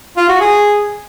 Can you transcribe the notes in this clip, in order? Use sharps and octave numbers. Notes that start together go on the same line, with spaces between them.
F4
F#4
G#4